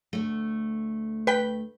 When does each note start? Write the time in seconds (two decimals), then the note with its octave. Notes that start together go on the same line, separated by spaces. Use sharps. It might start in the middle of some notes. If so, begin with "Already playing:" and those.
0.13 D2 A3
1.27 B4 G5 B6